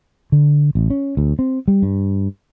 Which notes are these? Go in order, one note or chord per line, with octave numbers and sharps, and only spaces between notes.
D3
A1
C#4
D2
C4
G3
G2